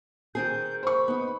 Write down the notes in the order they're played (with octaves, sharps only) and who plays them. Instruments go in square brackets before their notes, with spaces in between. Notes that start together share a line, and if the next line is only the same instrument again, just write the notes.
[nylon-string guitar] D#3 C4 G#4 [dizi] G6
[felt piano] C5 C#6 [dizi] B5
[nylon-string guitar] B3 D#4